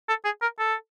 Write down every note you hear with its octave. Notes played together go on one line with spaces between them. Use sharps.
A4
G#4
A#4
A4